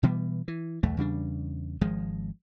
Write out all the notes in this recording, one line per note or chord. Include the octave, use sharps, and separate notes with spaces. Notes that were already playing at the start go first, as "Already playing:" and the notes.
B2 E3 G3 B3
E3
B1 E2 A3
E2 C#3 G3 D4
G#1 F3 G#3